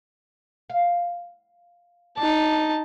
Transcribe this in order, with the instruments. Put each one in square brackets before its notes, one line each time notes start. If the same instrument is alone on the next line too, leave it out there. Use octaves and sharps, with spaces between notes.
[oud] F5
[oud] D4 [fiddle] D#4 A5